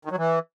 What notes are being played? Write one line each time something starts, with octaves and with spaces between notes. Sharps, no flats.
D#3
F#3
E3